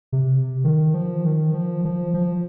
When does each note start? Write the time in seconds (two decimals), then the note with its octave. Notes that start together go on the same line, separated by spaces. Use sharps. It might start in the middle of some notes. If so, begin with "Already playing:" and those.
0.12 C3
0.64 D#3
0.94 F3
1.25 D#3
1.54 F3
1.85 F3
2.14 F3